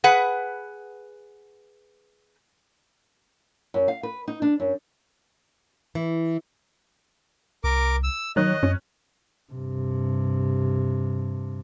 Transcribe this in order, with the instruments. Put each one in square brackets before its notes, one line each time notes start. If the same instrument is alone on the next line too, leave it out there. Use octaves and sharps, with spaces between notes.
[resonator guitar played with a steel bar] G#4 B4 F#5
[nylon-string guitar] F#2
F5
B4
D#4
D4
F#2
E3
[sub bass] C2 [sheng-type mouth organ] A#4 D6
[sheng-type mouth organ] E6
[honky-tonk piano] D#3 C#5 F#6 [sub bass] F#3 [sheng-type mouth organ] D#5
[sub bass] F#2 [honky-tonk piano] C#4
[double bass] G2 C3